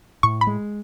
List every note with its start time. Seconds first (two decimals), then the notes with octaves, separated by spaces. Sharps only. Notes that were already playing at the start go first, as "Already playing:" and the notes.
0.23 A2 C#6
0.41 B5
0.47 G#3